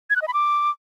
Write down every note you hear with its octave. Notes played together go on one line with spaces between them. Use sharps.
G#6
F#6
D#5
B5
D6